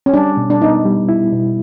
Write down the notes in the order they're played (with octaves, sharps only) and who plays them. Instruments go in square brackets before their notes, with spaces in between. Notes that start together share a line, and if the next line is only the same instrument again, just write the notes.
[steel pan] C#4
[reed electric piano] G3 [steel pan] D4
[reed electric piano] B2
[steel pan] D4
[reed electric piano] B3 [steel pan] D#4
[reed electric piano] G3
E4
B2